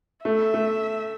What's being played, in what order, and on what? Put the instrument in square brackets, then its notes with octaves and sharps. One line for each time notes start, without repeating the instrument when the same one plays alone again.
[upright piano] A3 [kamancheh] E5
[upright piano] A3